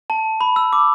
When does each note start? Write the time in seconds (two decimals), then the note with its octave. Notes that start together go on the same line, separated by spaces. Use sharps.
0.10 A5
0.41 B5
0.56 E6
0.73 D6